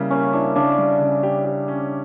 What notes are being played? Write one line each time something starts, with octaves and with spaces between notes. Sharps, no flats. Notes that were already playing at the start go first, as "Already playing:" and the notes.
Already playing: C#3 G3 A#3 E4
A#3 C#4
D4 E4
C#3 D4
G3
C#3
G4
G4
C#4